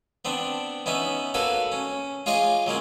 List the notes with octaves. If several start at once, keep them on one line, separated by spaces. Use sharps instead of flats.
B3 C4 D4
B3 C#4 D#4 E5
A#3 F#4 A4 B4 C#5
C#4
F4 G#4 C#5 D#5 F5 D6
F#3 G#3 A#3 C#4